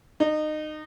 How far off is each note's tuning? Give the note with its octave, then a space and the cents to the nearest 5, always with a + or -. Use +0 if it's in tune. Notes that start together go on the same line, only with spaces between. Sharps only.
D#4 -25